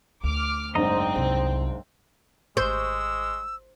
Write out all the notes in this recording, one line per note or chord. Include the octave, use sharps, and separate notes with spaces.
D2 D6 F6
F#1 G#2 C4 D4 D#5 A#5
C2
G#1 G#3 C5 C#6 E6